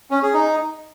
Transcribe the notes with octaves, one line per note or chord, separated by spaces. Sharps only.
C#4
G#4
D#4